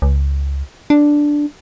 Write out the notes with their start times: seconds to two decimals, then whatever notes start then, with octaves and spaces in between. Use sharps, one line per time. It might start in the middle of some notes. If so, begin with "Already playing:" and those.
0.02 C#2
0.90 D4